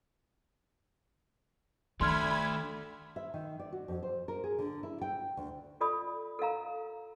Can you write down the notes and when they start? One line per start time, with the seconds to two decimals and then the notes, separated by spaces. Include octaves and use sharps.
2.01 D#3 A3 D4 B5 C6 F6 G#6
3.16 E5
3.34 D#3
3.59 D5
3.72 F#4
3.88 F2
4.03 C5
4.28 A#4
4.44 G#4
4.59 D3
4.83 E4
5.01 G5
5.37 D2
5.81 F4 A4 D5 B5 D#6
6.39 A4 A#4 F5 A#5